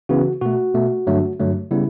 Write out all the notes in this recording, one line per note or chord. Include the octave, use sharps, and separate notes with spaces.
C#3 E3 B3 F#4
B2 A3 F#4
B2 A3
G2 D3 F#3 A3
G2 D3 F#3 A3
C#3 G3 B3 E4